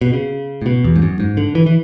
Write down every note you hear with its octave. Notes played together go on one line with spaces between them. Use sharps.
B2
C#3
A2
B2
E2
G#2
F#2
G#2
D3
E3
E3